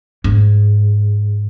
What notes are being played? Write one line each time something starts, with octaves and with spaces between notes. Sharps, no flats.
G#2